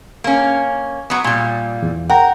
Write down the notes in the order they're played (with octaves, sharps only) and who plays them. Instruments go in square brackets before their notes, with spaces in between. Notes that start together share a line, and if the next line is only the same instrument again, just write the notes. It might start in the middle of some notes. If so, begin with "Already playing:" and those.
[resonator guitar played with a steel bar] A#3 C#4
F#3 B3
A#2 G3
[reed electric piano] E2
[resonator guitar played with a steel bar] A#4 [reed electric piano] F#5 G5 A#5